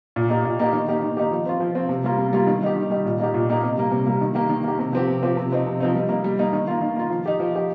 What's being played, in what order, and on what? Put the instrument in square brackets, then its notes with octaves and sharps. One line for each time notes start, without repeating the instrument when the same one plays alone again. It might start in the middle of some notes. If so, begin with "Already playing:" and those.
[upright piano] A#2
A#3 D#4 G4
A#2
A#3 D#4 G4
D#3
A#3 D#4 G4
D#3
A#3 D#4 G4
F3
C4 F4
F3
C4 F4
C3
G3 A#3 F4
C3
G3 A#3 F4
D#3
G3 D#4 G4
D#3
G3 D#4 G4
A#2
A#3 D#4 G4
A#2
A#3 D#4 G4
C3
G3 A#3
C3
G3 A#3
D#3
A#3 G4
D#3
A#3 G4
C3
F3 C4 G4
C3
F3 C4 G4
C3
F3 C4 D#4
C3
F3 C4 D#4
G3
A#3 D#4
G3
A#3 D#4
D#3
A#3 F4
D#3
A#3 F4
F3
D#4 G4
F3
D#4 G4